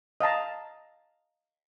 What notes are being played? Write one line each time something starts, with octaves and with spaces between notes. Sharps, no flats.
D#5 F5 A5 A#5